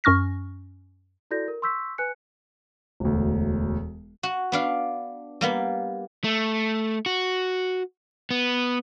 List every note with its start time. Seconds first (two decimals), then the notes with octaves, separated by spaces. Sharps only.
0.04 F#2 C#4 C#6 F6 A#6
1.31 E4 F#4 A4 D5 G6 A#6
1.48 A#4
1.62 C6 C#6 E6 G6 B6
1.98 B4 G#5 F#6 C#7
3.00 E1 D2
4.23 F#4
4.52 B3 D4 F5
5.41 G3 A#3 B3
6.24 A3
7.06 F#4
8.31 B3